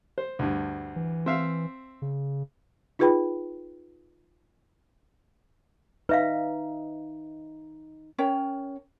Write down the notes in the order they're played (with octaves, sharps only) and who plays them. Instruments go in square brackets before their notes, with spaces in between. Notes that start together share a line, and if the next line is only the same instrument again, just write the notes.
[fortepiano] C5
D2 G2
[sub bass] E3
[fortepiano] C4 E5 F5
[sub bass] C#3
[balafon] D#4 F4 G#4 B4 G5 B5
[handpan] D#4 [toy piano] B4 E5 F5
[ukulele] C#4 A#4 C#5 G5